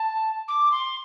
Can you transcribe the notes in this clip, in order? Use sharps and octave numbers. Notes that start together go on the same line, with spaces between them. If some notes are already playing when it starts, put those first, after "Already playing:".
Already playing: A5
D6
C6